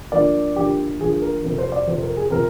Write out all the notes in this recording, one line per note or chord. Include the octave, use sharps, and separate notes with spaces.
D3 F3 A#3 D5
D3 F3 A#3 G4
D3 F3 A#3 G#4
A#4
F2 C3 F3 C4 A#4
C5
D5
F2 C3 F3 C4 C5
A#4
G#4
C3 F3 C4 A#4